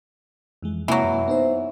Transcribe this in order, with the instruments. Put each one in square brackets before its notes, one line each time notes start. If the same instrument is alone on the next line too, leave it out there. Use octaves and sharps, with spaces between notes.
[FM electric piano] F2 E3 G#3
[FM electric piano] C3 A#3 E4 [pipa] E3 F#3
[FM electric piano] F#2
B3 D#4 C5